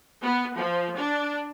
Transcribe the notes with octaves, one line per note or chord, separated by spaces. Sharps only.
B3
F3
D4